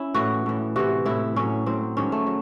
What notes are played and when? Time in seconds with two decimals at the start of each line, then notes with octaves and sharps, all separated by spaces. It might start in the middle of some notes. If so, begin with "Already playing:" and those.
Already playing: C#4 E4
0.14 A2 E3 F#4
0.46 A2 E3
0.76 C3 E3 F#4
1.05 A2 E3 E4
1.36 A2 F#3 C#4
1.66 A2 F#3 C4
1.97 G#2 D#3 F#3 C#4
2.12 A3
2.27 F#3